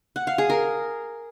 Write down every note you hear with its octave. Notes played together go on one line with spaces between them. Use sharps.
F#5
F5
G#4
A#4